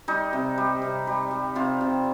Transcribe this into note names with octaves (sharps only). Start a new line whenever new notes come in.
G3 D#4
C3
G3
C3
G3
G3
C3 F4
C3